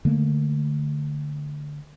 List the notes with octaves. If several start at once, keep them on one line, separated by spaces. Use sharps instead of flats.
D3 A3 A#3